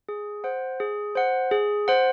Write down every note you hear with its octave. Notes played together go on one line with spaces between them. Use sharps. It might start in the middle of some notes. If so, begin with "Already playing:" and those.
G#4
C5 F#5
G#4
C5 F#5
G#4
C5 F#5